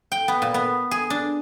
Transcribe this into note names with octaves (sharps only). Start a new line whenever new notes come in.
G5
B3
A#2
B3
G#4
D4